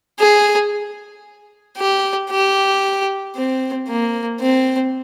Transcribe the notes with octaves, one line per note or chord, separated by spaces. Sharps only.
G#4
G4
G4
C4
A#3
C4